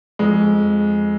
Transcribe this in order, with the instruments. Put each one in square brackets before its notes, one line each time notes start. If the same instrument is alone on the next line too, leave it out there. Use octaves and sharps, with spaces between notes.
[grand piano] F2 G#3